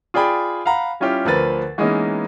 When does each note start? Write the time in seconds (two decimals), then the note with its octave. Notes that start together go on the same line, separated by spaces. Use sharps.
0.14 F4 G#4 D5 G5 B5
0.66 F5 F#5 A#5 B5
1.00 G3 C#4 E4 F4 G4
1.25 D2 F3 A#4 B4 A6
1.78 E3 G#3 A#3 B3 C#4 D#4